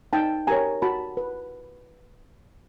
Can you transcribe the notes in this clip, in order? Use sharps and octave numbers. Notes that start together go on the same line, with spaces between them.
D#4 G5 A5
G4 A#4 C#5 G#5 A#5
F#4 A5 B5
B4